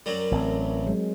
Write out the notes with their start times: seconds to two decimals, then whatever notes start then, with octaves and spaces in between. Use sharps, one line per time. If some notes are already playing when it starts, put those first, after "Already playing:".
0.06 F#2 F#3 G3 A#4
0.31 A1 C4
0.86 F#3 G#3